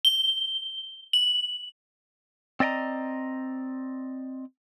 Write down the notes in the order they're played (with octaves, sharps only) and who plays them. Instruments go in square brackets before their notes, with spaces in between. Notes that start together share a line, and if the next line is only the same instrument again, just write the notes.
[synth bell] G7
F#7
[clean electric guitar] C4 D5 D#5 G5 A#5